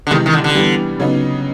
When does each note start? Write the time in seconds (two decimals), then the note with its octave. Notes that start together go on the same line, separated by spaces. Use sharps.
0.07 D3
0.11 C3 D#3 E3 G#3
0.26 D#3
0.33 D3
0.44 D3
0.55 E3 G3 B3
1.00 C#3 F#3 B3 D#4